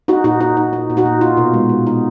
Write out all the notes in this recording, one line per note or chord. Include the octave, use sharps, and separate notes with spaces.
D#4 F#4
A#2 D#4 F#4
D#4
D#4
D#4
A#2
D#4 F#4
A#2
D#4 F4
B2
G#3
B2
D#4